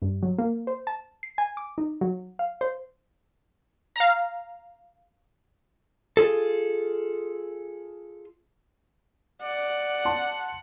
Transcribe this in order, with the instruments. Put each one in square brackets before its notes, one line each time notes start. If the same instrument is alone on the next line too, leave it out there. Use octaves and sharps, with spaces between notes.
[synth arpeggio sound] G2
F#3
A#3
C5
A5
C7
G#5
D6
D#4
F#3
F5
C5
[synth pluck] F5 A#5
[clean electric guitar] F4 G#4 A4
[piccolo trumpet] D5 [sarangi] F#5
[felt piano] A5 C6